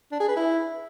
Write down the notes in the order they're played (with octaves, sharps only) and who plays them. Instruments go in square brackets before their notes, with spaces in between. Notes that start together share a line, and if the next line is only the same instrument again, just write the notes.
[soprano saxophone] D4
G#4
B4
E4